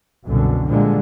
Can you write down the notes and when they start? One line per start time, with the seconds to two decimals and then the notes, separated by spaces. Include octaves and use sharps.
0.25 C2 F#2 B2 D3
0.66 A#2 D3 F3 G3 G#3